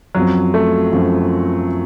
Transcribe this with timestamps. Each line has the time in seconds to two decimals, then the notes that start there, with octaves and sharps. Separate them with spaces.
0.15 F#2 F3 F#3 C4
0.54 A3
0.92 F#2 F3 C4